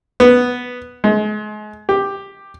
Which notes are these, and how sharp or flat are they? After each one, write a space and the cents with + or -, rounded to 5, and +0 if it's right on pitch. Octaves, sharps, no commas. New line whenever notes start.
B3 +0
G#3 +35
G4 +5